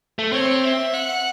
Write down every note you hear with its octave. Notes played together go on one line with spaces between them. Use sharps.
A3
C4 C#5
E5
F#5